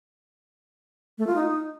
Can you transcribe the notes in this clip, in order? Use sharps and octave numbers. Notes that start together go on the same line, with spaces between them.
A3
F4
D#4